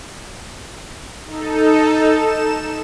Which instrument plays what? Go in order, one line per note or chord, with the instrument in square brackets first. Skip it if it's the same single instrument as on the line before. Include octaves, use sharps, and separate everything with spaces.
[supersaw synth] D#4 A4
E7